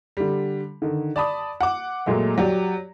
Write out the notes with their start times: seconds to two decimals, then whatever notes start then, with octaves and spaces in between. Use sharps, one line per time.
0.17 D3 G3
0.82 D3 D#3
1.16 D5 A5 B5 D#6
1.61 F#5 D6
2.06 A#2 F#3 G#3 A3
2.38 F#3 G4 D5